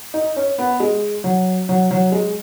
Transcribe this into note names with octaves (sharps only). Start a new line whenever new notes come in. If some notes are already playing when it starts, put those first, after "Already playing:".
D#4
C#4
B3
G#3
F#3
F#3
F#3
G#3